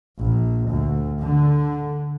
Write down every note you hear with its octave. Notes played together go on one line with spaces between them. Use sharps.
A#1
D2
D3